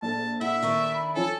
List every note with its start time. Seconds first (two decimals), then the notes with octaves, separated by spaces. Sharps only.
0.02 A#1 A4 A5
0.41 E4 E5 F#5
0.63 D#3 D4 E4 C#6
0.94 B5
1.15 F3 F4 A4 C#5 G#5